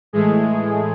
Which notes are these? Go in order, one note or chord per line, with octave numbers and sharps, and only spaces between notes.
A2 E3 G#3 A3 G#4